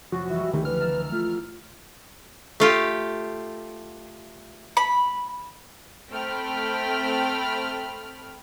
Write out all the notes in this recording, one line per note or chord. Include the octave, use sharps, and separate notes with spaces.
F1 F#2 F3 F#4
E3 G3 G#3 E5
C#2 D3 D#3 A3 G4
E2 F3 B4 F6
E5 A5 A#5
A3 F4
A3 F4 G4
B5
A3 C4 G5 B5 F6